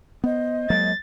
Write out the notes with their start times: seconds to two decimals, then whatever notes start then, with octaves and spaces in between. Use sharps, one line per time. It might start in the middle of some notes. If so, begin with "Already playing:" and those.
0.24 B3 C5 D#5
0.70 F#3 G#3 A#3 A6